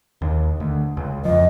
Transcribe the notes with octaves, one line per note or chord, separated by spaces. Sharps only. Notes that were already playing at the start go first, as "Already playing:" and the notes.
D#2
D2
C#2
F2 F3 D#5